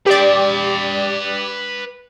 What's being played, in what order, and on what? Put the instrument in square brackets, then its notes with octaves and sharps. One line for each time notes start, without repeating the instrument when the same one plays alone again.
[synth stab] G4 D5 [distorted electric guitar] B4 G5